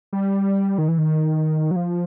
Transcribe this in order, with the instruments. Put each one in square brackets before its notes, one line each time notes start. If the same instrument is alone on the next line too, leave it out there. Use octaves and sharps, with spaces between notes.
[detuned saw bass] G3
D#3
E3
D#3
F#3
F3